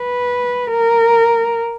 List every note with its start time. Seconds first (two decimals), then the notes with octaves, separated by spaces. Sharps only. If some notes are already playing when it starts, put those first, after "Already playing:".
Already playing: B4
0.71 A#4